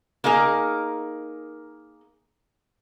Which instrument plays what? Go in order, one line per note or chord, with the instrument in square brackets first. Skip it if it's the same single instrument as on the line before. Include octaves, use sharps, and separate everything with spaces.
[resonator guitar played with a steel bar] A#3 D#4 G#4 A#4